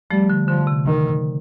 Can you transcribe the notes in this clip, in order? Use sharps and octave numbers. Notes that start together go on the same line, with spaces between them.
F3 G3 A3
D3
D3 F3
C3
D#3